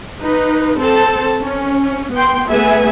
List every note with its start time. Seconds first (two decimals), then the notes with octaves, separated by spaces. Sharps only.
0.22 D#4 B4
0.79 C4 A4 A5
1.42 C#4
2.14 B3 G5 C6
2.49 A3 B3 G#4 B4 E5 G#5